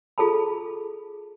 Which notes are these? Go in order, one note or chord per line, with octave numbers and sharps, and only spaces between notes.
F4 G#4 A4 A5 B5